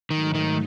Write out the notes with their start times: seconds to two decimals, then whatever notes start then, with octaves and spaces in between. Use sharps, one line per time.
0.10 G#2 D#3 F#3 A3 D#4
0.35 D#3